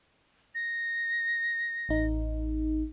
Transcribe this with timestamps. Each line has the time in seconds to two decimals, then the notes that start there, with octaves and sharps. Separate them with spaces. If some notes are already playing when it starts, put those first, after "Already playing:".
0.55 A#6
1.89 A1 D#4